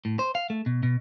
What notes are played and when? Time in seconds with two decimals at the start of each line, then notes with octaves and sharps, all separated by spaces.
0.05 A2
0.19 C5
0.35 F5
0.50 A3
0.66 B2
0.83 B2